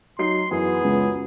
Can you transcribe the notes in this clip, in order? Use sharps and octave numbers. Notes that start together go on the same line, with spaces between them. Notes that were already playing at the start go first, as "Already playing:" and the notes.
F#3 D#4 C6 C7
F#2 E3 B3 G#4
C#2